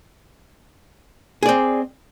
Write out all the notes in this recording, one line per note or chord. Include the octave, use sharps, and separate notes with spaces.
C4 G#4 D5